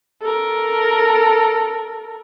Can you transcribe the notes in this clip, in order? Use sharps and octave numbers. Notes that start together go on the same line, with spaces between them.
A4 A#4